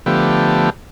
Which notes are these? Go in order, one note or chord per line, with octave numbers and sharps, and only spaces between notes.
D3 F3 A3 B3 G4